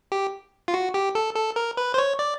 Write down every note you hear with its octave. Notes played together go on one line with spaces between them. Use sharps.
G4
F4
F#4
G4
A4
A4
A#4
B4
C5
C#5
D5